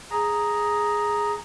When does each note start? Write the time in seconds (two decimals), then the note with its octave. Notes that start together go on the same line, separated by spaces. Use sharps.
0.11 G#4 A#5